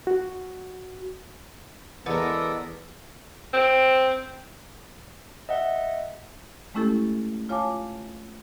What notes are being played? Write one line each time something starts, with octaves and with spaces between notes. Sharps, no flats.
F#4
E2 G#3 B3 A4 A#4 D5
C4
D#5 E5 F#5
G#3 A3 C#4 E4 G4 A4
F4 C#5 F5 G#5 A5 D6